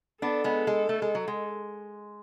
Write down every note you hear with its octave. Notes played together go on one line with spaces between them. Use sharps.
B3 D4 A4
G#3 B3
G#3
A3
G#3
F#3
G#3